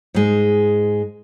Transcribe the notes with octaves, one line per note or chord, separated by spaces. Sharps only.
G#2 G#3